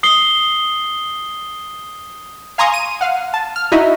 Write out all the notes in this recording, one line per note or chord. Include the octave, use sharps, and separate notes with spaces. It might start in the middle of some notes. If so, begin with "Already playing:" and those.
D#6 C7 G7
F5 G#5 A#5 C6 C#6 D#6
D#7
F5 F#5
A5
F6
D#4 E4 F#4 D#5 E5